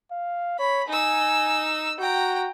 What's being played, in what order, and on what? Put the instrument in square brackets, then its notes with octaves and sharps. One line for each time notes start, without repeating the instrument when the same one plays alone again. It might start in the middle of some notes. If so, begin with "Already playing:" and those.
[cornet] F5
[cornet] C#5 [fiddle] B5
[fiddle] D#4 E6 [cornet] G#5
[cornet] F#4 [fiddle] G5 A#5